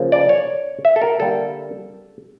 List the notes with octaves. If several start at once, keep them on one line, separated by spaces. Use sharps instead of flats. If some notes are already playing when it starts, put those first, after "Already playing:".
Already playing: C#3 F3 A#3
D5
C#5
E5
A4
A#4
D3 G3 A#3 A4